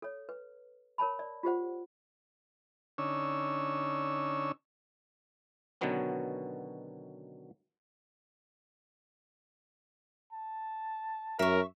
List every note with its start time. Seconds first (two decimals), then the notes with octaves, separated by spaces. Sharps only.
0.02 A4 C#5
0.29 B4
0.98 A#4 C#5 A5 B5
1.19 D5
1.43 F4 G4 C5 F#5
2.98 D3 C#4 D#4 C#5 E6
5.81 B2 D3 D#3 F#3 B3 C#4
10.32 A5
11.39 F#2 C#4 A#4 E5 C#6